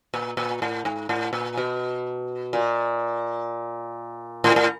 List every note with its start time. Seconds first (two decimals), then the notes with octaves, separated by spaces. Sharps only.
0.14 A#2
0.37 A#2
0.62 A2
0.85 G#2
1.09 A2
1.33 A#2
1.57 B2
2.53 A#2
4.44 A2
4.56 A2